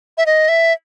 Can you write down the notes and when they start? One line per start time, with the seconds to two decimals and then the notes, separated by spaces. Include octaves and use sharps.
0.18 E5
0.26 D#5
0.49 E5